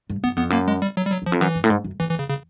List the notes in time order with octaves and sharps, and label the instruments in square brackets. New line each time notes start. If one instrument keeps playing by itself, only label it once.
[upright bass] G2
[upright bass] F#2 [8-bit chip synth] B3
[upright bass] F2 [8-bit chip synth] B3
[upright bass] F#2 [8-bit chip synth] A#3
[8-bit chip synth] G#3
G3
F#3
G3
F#3
[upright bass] E2 [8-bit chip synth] F3
[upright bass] F2
[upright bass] F#2 [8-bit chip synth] E3
[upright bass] G2
A2
G#2
F#2
[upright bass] E2 [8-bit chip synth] E3
[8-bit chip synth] E3
C#3
C#3